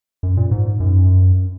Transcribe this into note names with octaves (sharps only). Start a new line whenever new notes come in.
F#2
A#2
G#2
F#2